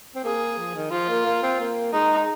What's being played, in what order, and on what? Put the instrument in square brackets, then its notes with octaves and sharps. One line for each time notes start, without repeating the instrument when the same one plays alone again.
[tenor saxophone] C4
[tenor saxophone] A#3 [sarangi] G#4
[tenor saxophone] F3
D#3
[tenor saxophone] F3 [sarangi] F4
[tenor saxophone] A#3
A#3
C4
A#3
[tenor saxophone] G#3 [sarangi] D#4